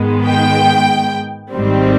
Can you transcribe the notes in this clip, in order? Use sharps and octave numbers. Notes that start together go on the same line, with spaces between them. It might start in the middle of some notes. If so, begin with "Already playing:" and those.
Already playing: G#2 D#3 G#3 B3
G5
G#1 G#2 D#3 G3 C4